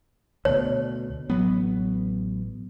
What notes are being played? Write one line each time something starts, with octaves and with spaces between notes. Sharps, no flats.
D2 B2 C#5
A1 F#3 B3